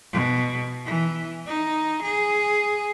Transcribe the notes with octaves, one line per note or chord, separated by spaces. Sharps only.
B2
E3
D#4
G#4